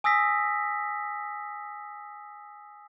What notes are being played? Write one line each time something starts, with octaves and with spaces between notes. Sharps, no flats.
G#5 D#6 E6 A#6 B6